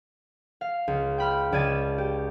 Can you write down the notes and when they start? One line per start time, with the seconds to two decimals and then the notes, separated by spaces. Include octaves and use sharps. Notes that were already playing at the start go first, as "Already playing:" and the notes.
0.61 F5
0.88 C#2
1.18 G5 B5 F6
1.52 C#2 D5 A5 G#6 A6 D#7
1.98 G4